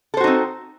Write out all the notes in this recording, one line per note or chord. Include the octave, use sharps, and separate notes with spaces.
C4 D#4 F#4 A4 C5